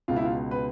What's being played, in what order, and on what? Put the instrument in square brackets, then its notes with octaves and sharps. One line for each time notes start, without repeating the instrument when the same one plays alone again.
[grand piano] C#2 B2 F4
E4
F4
B4